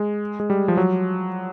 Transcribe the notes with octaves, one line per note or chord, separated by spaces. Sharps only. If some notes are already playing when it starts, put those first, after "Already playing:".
Already playing: G#3
G#3
G3
F3
F#3